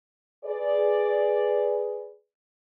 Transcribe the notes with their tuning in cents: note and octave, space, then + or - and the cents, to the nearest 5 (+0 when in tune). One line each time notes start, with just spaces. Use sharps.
G#4 +0 B4 +0 D5 +0